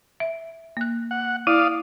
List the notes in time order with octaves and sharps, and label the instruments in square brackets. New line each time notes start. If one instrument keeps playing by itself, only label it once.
[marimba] E5
A#3 F#6
[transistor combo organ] F#5
[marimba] E4 [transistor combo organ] D5 F5 D#6